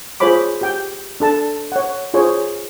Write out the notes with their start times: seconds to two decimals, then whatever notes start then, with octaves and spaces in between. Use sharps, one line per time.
0.20 F4 G#4 C5 C#5 B5 D6
0.61 G4 G5
1.20 D4 A4 A5
1.72 C#5 F#5
2.14 F4 G#4 C5 C#5